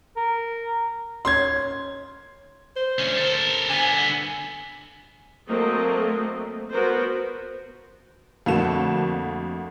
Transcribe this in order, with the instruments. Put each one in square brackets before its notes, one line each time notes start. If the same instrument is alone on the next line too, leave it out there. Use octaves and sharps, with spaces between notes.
[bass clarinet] A#4
[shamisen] D#3 C#4 C#5 [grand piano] C6 G#6
[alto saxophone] C5
[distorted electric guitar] D2 C#4
A4 A#4
[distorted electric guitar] D3 B3 [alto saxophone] G#5
[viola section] F#3 A3 A#3 C4 A4 D#5
B3 F#4 A#4 C5
[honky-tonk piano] F2 D3 A3 A#3 F#4 E7